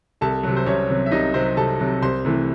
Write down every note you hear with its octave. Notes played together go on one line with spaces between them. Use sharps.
C2 A4 A5
C3 F#3
C5
C2 C#4 C#5
C3 F#3
E5
C2 D#4 D#5
C3 F#3 C4 C5
C2 A4 A5
C3 F#3
C2 C5 C6
C3 E3 A3